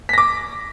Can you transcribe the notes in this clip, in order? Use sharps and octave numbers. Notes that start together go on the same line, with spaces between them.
D6 A#6 B6